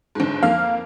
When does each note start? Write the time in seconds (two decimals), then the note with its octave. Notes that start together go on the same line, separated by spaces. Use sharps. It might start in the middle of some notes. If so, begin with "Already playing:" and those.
0.15 G1 G#2
0.43 F2 A#3 F5 F6